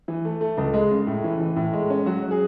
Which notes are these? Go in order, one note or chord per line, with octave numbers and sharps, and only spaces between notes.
E3
A3
A3
C#2
G#3
C#3
A2
E3
E3
A2
G#3
C#4
F#3 F#4
G#4